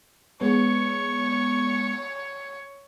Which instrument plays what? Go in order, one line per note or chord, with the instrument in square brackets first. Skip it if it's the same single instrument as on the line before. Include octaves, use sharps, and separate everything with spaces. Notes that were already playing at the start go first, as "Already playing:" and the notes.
[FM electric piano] G#3 B3 [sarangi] C#5 [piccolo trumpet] C#6